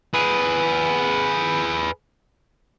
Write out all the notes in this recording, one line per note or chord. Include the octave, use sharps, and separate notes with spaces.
G#4 B4